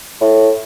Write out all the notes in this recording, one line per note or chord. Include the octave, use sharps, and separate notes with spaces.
A2